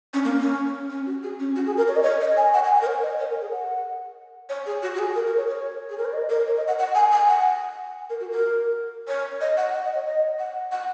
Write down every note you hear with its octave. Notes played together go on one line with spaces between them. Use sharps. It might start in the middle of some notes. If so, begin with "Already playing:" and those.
C#4
A#3
C#4
C#4
F#4
G#4
C#4
F#4
G#4
A#4
C#5
D#5
C#5
D#5
G#5
F#5
G#5
F#5
A#4
C#5
D#5
C#5
A#4
G#4
F#5
C#5
G#4
F#4
F#4
G#4
A#4
A#4
C#5
C#5
G#4
A#4
C#5
D#5
A#4
C#5
D#5
F#5
F#5
G#5
G#5
F#5
A#4
F#4
A#4
C#5
D#5
F#5
F#5
D#5
C#5
D#5
F#5
F#5